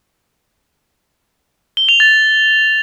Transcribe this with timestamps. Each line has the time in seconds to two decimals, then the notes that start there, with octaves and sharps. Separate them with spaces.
1.77 G7
1.89 F7
2.00 A6